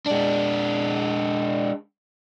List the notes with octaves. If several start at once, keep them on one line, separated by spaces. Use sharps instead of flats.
G#3 D4